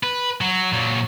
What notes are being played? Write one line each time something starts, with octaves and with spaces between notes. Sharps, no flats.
B4
F#3
A#2 F#3